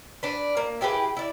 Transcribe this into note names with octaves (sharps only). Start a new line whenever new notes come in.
D4 B4
A#3
E4 G4 G#4 B4
E4 D5